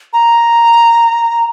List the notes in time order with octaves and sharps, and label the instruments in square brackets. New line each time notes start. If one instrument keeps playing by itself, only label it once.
[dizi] A#5